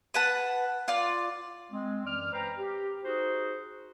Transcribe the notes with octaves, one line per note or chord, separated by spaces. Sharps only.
B4 F#5 A5
F4 D5
G#3 C4
F#2 E3 D5 F6
B4 C5 G5 A#5
G4
D#4 F#4 G#4 C5